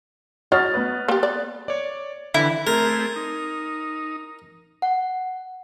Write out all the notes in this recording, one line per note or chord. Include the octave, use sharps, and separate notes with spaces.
F#3 F#4 C#5 D#5 F6 A6
B3 B4
A#3 G4
D5
C#5 D5
D3 E3 E4
A3 C4 G#4 A#4
D#4
F#5